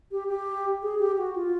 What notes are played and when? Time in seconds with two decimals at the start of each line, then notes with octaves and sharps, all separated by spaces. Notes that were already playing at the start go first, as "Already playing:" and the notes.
0.12 G4
0.29 G4
0.83 G#4
0.99 G4
1.18 F#4
1.36 F4